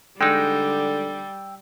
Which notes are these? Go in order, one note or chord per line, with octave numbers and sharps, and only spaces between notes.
D3 G3 G#3 D#4 G5 E6